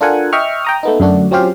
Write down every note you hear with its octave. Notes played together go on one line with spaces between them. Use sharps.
D4 F4 A4 A#4 F#5 G#5
D#5 E5 G5 C#6 F6
G5 A#5 D#6
A3 B3 D#4
F#2 D3 A3 D4 F#4
F#3 C4 C#4 F4 G4 F5